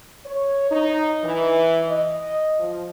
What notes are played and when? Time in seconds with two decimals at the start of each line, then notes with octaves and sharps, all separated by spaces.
0.25 C#5
0.71 D#4
1.24 E3
1.89 D#5
2.59 F3